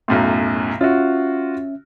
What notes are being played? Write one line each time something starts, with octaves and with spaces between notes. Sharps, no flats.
B1 F#2 A2
C#4 F4 F#4 E5